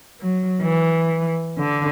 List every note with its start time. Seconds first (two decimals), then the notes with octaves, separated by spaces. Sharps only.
0.20 F#3
0.62 E3
1.58 D3